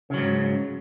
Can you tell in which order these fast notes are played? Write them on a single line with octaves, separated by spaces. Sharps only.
C#3 F#3 G#2